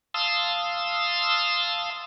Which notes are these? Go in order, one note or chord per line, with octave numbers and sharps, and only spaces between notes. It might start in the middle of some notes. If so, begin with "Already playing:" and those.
F5 A5 C6 D#6 E6